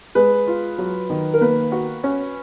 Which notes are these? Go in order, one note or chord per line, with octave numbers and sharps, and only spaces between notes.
G#3 B4
F4
F#3
D#3
A#4
A#3 B4
F#4
C#4